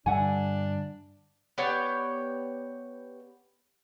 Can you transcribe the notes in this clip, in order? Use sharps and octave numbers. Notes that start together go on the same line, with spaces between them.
G2 D3 G3 D4 E5 F#5 G#5
B3 G4 C#5 D5